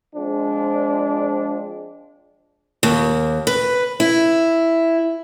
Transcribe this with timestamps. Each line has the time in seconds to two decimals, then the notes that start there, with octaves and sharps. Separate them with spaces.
0.15 F3 G#3 C4 D4
2.83 D#2
3.47 B4
4.00 E4